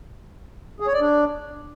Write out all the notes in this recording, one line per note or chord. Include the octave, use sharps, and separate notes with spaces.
G#4
C#5
D5
D4